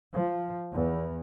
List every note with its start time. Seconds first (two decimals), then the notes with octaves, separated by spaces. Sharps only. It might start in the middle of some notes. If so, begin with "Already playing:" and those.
0.13 F3
0.73 E2